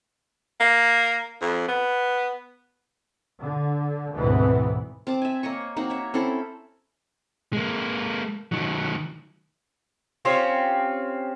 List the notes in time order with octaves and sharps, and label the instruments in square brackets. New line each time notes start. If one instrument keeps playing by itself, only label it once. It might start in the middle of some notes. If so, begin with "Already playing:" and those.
[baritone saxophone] A#3
F2
B3
[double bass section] D3
D2 G#2 B2 E3 B3 C4
[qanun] C4 A5 D6
E5 G#5
A#3 C#5 D#5 C#6
A#3 C4 D#4 F#4
C#5 E5
C4 C#4 E4 A4
[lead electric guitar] G#3 A#3
D#3 F#3
[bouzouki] C4 C#4 F4 G4